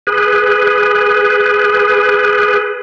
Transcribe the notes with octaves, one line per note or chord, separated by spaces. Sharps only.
G#4 B4